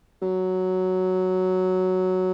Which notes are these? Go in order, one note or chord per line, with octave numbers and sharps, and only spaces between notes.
F#3